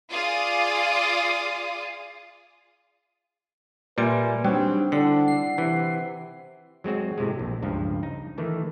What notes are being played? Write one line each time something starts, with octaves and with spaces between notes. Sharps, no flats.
F4 G#4 D5 F5 D#6
A#2 G3 B4 E5 G#5 C6
F#3 G3 C4 D4 D#4 G4
D3 D4 E4 F#5
C7
C3 E3
F#3 G#3 C4 F#4
A2 C3 G#3
A#1
C#2 G2 F3
D#4
D#3 E3 A3